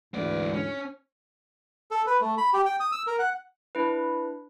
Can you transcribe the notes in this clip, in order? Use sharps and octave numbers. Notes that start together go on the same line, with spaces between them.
D2 G#2 E3 B3 D5
C#4
A4
B4
A3
B5
G4
G5
D#6
E6
A#4
F#5
D4 E4 B4